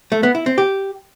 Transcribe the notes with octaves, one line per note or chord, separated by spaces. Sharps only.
A3
B3
E4
C4
G4